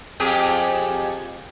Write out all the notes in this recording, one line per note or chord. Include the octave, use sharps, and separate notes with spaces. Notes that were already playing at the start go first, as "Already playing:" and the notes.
F2 G4 G#4